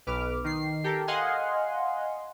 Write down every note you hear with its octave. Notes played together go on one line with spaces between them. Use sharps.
B1 B4 D6 F6
D#3 C7
G4 A4 A#4
D#5 F5 F#5 G#5 C6